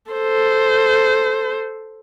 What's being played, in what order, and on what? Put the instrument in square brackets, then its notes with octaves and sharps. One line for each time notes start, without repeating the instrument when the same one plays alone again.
[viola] A4 C5